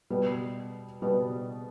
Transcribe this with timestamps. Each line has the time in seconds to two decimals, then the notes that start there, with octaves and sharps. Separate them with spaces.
0.10 B2 G3 B3
1.02 B2 G3 B3